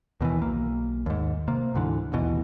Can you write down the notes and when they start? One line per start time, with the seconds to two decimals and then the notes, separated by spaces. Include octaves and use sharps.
0.21 D#2 B2 D#3 E3
0.39 B1 A#3
1.06 D#2 G#2
1.48 C3 A#3
1.74 D2 G#2 D3 E3
2.12 A1 D#2 B2 E3